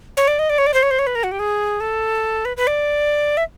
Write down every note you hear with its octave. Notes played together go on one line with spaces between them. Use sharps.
C#5
D5
D#5
D5
C#5
D5
C5
C#5
C5
C#5
B4
A#4
F#4
G4
G#4
A4
B4
B4
D5
E5